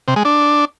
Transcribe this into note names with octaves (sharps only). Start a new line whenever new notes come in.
C3
G#3
D4